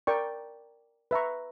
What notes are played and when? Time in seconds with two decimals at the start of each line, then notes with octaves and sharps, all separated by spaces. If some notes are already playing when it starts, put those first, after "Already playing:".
0.07 A#4 D5 G5 C#6
1.11 B4 E5 A#5 C#6